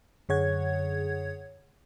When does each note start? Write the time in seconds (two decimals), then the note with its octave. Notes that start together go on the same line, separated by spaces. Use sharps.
0.29 F#2 D3 G#4 C#5 F#5 G#6